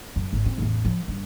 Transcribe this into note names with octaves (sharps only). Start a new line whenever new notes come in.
F#2
G#1
C4 F4
A1 E2
F3
G2